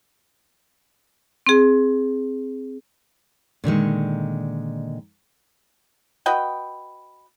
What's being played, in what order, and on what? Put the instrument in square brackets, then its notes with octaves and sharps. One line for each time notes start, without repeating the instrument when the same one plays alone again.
[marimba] C4 G#4
[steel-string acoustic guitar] A#2 D3 D#3 G#3
[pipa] F#4 B4 D#5 G5